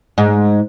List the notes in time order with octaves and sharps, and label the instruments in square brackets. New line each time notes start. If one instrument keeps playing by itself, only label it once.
[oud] G#2